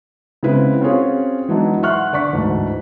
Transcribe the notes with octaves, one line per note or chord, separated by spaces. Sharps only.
C#3 G#3 B3 C4 E4 B4
C4 C#4 F4 F#4 G#4 C#5
E3 F#3 G#3 B3 D4 D#4
E5 F#5 C6 C#6 F6 F#6
D3 D5 C#6 B6
D2 G#2 E3 A3